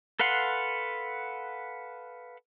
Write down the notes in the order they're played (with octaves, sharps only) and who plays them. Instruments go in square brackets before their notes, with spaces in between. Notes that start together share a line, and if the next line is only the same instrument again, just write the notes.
[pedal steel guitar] A4 B4 F5 F#5 C6